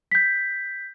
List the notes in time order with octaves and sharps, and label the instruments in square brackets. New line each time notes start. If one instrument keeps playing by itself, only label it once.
[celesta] G6 B6